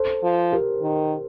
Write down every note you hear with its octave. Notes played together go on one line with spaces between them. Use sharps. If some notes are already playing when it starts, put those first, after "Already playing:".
Already playing: A4 C5
F3
G4 A#4
D#3